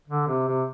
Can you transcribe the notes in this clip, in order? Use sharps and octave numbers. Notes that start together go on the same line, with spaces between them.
D3
C3
C3